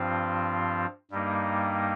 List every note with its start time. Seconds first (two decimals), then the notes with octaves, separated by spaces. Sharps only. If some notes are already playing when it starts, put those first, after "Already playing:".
Already playing: G2 F3 C4 F4
1.11 G2 G3 A#3 D#4